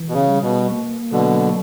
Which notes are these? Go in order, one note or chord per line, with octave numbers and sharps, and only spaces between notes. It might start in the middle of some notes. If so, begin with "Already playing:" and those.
Already playing: E3
B2
C#3
G3
B2
A#3
B2 D3 F#3